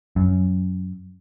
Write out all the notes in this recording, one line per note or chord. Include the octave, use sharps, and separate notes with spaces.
F#2